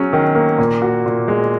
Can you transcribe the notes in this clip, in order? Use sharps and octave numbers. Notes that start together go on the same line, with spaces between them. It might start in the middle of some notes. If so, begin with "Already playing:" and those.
Already playing: F#3 C#4 G#4
D#3
A#3
A#2
F#4
A#2
G#3